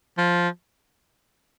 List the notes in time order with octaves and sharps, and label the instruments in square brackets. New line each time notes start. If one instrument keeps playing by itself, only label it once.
[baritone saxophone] F3